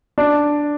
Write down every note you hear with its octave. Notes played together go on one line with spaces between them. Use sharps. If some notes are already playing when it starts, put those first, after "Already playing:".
D4